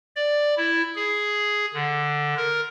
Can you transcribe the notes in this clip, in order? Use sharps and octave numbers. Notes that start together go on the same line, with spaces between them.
D5
E4
G#4
D3
A#4